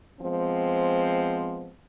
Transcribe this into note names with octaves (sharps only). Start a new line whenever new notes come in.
F3 G#3 B3 C4